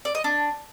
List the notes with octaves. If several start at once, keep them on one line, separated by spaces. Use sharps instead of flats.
D5
D#5
D4